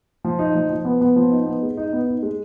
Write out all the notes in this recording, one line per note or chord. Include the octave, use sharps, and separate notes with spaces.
F3
D#4
F3
F3
B3
B3
F3
D#4
B3
G#3
D#4
B3
D#4
G#3